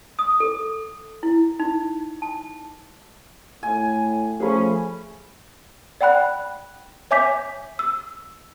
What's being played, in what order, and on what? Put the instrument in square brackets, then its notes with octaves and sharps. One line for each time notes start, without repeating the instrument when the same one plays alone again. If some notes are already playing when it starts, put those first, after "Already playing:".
[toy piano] D#6
A4
E4
D#4
A5
[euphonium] A2 [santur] G#5
[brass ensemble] F3 C#4 [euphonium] A3 [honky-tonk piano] G#4 B5
[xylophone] D5 F#5 G5 B5 F#6
C#5 E5 G#5 D6 G6 B6
E6